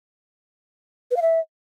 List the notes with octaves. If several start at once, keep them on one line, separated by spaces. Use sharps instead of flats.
B4
F5
E5